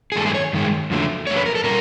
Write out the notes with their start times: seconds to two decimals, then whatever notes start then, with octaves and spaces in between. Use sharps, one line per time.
0.12 G#4
0.16 G2 D#3 G#3 A4
0.26 G#4
0.34 C#5
0.53 G2 D#3 G#3
0.90 F2 D3 F#3 A3
1.27 F2 D3 F#3 A3 C#5
1.37 B4
1.46 A#4
1.55 A4
1.64 B2 G3 A#4